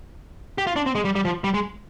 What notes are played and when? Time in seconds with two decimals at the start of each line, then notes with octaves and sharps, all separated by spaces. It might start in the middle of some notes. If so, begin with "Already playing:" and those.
0.58 G4
0.67 F4
0.76 D4
0.86 C4
0.95 G#3
1.05 G3
1.15 G3
1.25 F3
1.44 G3
1.54 G#3